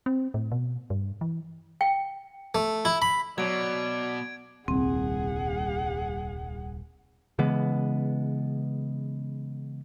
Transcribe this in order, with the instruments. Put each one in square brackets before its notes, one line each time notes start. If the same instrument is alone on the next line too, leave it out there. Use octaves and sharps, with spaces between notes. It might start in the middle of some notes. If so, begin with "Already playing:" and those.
[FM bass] C4
A2
B2
G2
E3
[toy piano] G5
[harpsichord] A3
E4
B5
[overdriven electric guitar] B2 [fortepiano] F#3 [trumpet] D5 [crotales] G#6 D7
[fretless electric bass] D#1 C2 [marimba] C4 [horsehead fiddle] G#4 F#5
[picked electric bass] C#3 E3 G#3 B3